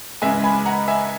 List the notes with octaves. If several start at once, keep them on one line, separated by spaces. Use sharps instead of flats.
C#2 C#3 E3 G#3 E5 G#5
G#5 B5
F#5 A#5
E5 G#5